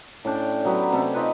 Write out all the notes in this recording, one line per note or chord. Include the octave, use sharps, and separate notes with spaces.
A2 C#4 D4 G5
F#3 B3 G4
C3 A3 C#4
D#4 F4 B4